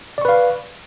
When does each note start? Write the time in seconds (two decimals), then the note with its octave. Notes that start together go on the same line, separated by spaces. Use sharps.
0.18 D5
0.21 C#6
0.25 B4
0.28 F5